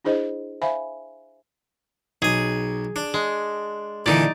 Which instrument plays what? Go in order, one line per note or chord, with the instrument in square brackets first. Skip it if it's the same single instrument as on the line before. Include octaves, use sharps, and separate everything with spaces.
[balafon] D4 E4 G#4 C5 D#5
C5 E5 F5 G#5 B5
[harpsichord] B1 G#5 [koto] G#4
[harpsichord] D4
[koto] G#3
[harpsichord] A#2 D3 E3 [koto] D#4 D5